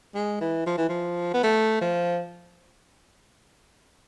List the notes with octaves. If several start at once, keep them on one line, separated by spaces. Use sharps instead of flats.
G#3
E3
F3
E3
F3
B3
A3
F3